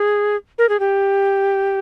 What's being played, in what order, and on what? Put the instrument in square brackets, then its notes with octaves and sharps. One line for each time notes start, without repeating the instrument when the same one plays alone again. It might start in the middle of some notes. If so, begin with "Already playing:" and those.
Already playing: [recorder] G#4
A#4
G#4
G4